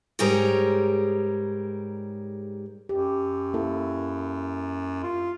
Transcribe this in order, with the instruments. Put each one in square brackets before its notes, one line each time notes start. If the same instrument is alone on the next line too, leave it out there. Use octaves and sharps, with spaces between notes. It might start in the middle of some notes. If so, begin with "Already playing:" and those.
[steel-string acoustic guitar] G#2 G3 G#4 A#4 C#5 A#5
[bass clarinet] F#2 [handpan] G4
[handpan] A#3 E4 A4
[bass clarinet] F4